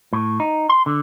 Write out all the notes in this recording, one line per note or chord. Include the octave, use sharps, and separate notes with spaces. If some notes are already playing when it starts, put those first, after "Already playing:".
A2
D#4
C6
D3